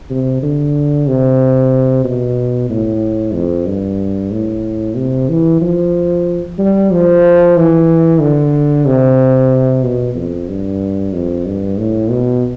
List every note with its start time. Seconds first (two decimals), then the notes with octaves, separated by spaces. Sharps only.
0.10 C3
0.43 D3
1.07 C3
2.04 B2
2.70 A2
3.34 F2
3.66 G2
4.32 A2
4.96 C3
5.29 E3
5.61 F3
6.58 G3
6.91 F3
7.56 E3
8.20 D3
8.86 C3
9.83 B2
10.15 F2
10.48 G2
11.13 F2
11.46 G2
11.78 A2
12.10 B2